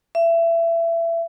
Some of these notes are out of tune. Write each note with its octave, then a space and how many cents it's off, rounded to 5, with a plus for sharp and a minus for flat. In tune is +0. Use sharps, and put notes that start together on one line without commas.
E5 +25